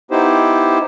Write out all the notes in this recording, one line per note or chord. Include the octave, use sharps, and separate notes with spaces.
B3 D#4 E4 G4 C5